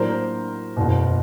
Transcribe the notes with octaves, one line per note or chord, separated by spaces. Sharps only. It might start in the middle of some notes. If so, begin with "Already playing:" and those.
Already playing: A2 F#3 A#3 D4 A#4 C5
F#1 E2 B2